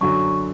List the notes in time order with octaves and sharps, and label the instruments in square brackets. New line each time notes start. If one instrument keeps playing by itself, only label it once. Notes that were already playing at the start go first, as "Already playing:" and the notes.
[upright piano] F#2 D3 F#3 [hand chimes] C#6